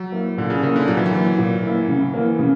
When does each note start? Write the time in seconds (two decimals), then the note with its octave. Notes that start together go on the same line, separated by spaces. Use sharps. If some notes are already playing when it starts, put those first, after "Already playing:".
Already playing: F#3
0.12 A#3 E4
0.37 A#2 D3
0.50 C#3
0.63 C#3 A#3 E4
0.76 D3
0.88 A#2 F#3
0.97 E3
1.06 F#3
1.13 A#3 E4
1.38 A#2
1.63 A#3 E4
1.88 C#3
2.14 E3 A#3
2.39 C#3